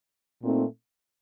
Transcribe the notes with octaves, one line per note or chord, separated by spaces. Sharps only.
A#2 A3 C4 D#4